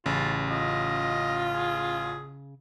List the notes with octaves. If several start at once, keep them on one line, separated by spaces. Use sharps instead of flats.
A1 C#3 F4
F4 D#5
G#4